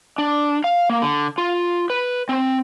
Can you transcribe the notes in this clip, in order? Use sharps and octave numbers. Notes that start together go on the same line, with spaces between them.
D4
F5
A#3
D3
F4
B4
C4